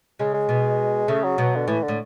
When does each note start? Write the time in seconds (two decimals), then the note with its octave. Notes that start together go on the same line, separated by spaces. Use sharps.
0.19 C#3 G#3
0.34 G#3
0.49 B2
1.08 C#3 A3
1.24 F#3
1.38 B2
1.56 D3
1.68 A2 E3
1.83 D3
1.88 A2